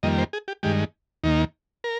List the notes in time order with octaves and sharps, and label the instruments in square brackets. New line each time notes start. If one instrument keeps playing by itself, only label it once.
[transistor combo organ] F2 D#3 G3 A#3 D#5
C5
G#4
G4
G2 D#3 G#3 G4
D#2 D#3 A#3 D#4
A#4